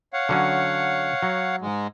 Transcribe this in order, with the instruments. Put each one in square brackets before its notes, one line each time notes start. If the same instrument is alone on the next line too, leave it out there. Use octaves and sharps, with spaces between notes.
[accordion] C#5 F5 F#5
[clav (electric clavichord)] D3 F#3 C#4
F#3
[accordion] G#2 G#3